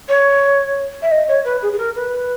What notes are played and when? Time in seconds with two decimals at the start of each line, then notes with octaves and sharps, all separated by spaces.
0.09 C#5
1.02 E5
1.11 D#5
1.28 C#5
1.45 B4
1.62 G#4
1.72 G#4
1.78 A#4
1.95 B4